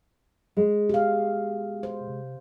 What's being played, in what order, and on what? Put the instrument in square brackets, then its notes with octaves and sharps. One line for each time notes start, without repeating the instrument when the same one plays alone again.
[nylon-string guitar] G#3
[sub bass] B2 [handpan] G4 F5
[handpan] C5
[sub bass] C3